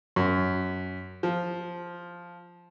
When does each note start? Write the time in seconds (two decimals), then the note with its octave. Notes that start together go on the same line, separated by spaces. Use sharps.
0.16 F#2
1.23 F3